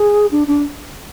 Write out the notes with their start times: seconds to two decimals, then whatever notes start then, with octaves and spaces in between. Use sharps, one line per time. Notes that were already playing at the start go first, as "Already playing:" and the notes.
Already playing: G#4
0.31 D4
0.47 D4